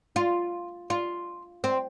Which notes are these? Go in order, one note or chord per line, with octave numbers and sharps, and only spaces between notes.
F4
F4
C4